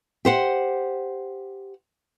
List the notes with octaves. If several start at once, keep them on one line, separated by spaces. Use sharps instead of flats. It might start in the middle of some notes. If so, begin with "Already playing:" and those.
G4 C5 F#5